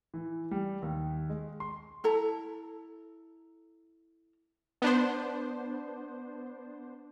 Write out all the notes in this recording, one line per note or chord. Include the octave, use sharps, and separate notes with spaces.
E3
G3
D#2
G#3
C6
E4 A4 A#5
B3 D4 C5